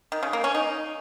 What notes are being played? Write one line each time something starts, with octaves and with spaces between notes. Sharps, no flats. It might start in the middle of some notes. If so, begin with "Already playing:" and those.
D#3
C#3
A#3
C#4
D#4